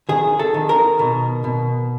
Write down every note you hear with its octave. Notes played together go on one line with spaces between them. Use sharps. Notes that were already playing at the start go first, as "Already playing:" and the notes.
D#3 G#4
A4
D#3
A#4
B2
B2